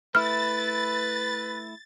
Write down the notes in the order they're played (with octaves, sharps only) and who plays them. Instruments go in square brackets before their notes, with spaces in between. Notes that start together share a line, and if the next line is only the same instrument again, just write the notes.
[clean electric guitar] A3 E4 [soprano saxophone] B4 [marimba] F6 [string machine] A6